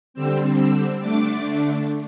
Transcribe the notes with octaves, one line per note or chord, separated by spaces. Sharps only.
D3 G3 C4 E6
E6
D3 A3 D4 D6